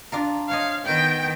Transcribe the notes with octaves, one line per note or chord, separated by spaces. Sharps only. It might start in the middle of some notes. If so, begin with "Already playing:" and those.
D4 F4 A#4
C5 C#5 D#5 F5
D#3 B3 G5